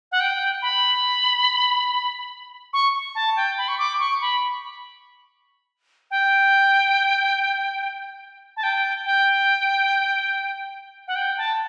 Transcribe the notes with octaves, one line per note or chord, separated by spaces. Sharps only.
F#5
G5
B5
C#6
A5
G5
B5
C#6
D6
C#6
B5
G5
A5
G5
G5
F#5
G5
A5